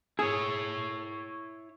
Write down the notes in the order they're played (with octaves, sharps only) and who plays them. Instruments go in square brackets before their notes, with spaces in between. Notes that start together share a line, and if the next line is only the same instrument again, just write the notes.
[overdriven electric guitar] E4 C#5 [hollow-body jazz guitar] G#4